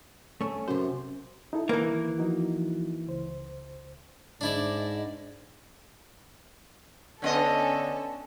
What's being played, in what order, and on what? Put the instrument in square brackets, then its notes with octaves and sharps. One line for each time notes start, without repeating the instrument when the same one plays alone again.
[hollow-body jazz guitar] A3 C#4
[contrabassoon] F#2 [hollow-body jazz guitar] C3 C5
[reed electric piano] D#4 E4 A4
[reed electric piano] D#3 B4 G#6 [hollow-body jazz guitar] E3 A#3
[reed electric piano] F3 D#4 F#4
C#2 C5
[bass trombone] G#2 [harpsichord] D4 E4 D5 [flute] D#5
[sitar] D3 B3 D#5 [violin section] C#4 A4